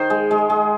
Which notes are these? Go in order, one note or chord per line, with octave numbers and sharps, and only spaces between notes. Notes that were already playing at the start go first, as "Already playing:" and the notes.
Already playing: D#3 C5
G#3
G#3
G#3